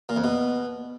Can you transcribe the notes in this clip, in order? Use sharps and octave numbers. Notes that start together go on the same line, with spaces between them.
A#2
F2
B2